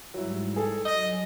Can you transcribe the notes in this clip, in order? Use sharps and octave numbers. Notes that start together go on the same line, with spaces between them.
G#2 F#3 G3 E4
G#4 A4 G#5
F#3 D#5